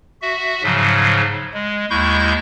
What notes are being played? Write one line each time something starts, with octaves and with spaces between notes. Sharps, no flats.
F#4 E5
G#2 C#3 F3 F#3
G#3
D#2 G#3 E4 C#6 G6